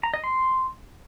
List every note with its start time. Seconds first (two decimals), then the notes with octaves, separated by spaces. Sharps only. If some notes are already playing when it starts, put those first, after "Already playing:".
0.03 A#5
0.14 D#5
0.24 C6